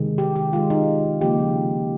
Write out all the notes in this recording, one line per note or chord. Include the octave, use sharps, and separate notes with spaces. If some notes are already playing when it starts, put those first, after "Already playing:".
Already playing: C3 D#3 G#3
G4
G4
D#3 G#3 F4
D#4
C#3 F3 A#3 G4